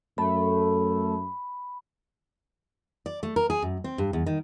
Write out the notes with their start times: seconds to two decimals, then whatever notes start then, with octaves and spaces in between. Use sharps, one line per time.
0.18 F#2 A3 B5
3.06 D5
3.23 A3
3.36 A#4
3.50 G#4
3.62 F#2
3.84 C4
3.98 G2
4.13 E2
4.27 D#3